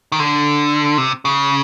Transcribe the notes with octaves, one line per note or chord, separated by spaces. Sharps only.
D#3
D3
C3
C#3